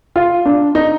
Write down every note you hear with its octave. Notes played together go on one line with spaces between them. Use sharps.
F4
D4
D#4